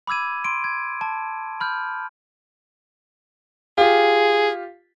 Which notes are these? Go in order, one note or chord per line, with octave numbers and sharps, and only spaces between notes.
B5 D6 E6 G#6 D#7
C6 D7
G#6
A5
B5 F6 G6
F4 G4 G#4